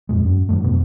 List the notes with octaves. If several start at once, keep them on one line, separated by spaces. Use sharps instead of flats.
F2 A#2 G#3
F#2
G2 D#3 F#3 A3
F2 B2